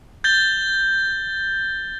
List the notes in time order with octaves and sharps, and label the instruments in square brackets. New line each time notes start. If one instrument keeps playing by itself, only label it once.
[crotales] G6 A6 G7